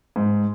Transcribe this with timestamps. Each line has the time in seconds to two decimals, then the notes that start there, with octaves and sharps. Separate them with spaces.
0.16 G#2